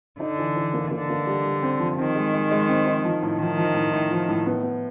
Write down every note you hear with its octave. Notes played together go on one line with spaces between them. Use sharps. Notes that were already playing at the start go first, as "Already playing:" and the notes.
D3 D#4
E3
E3
A#3
D3 A#3
A#3
G3
G3
C4
F3
D#3 C4
G#3
G#3
G#3
C4
D#4
F3
A2
D#3 F3
F3
A2
A2
F3
A2
B3
B3